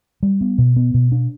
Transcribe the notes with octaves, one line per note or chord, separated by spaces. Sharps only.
G3
B3
B2
B3
B2
D4